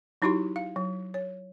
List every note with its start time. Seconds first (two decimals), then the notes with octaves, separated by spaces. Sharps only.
0.22 F#3 D#4 E4 F#4 G4 C6
0.56 F5
0.76 F#3
1.14 C#5